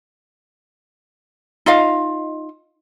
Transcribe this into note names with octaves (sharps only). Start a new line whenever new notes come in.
D#4 F4 D#5 F5